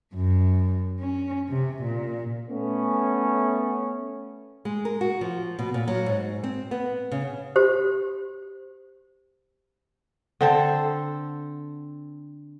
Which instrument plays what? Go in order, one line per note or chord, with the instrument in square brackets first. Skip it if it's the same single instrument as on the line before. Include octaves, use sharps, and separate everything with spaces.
[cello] F#2
C#4
C3
A#2
[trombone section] A3 B3 C#4
[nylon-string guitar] G#3
A#4
F#4
F3
B2
A#2
F#3
G#2
C4
B3
C#3
[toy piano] F#4 G4 C5
[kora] D3 C4 A4